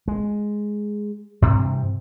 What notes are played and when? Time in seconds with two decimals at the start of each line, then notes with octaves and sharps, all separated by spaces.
0.08 G#3
1.42 G2 C3 E3 C4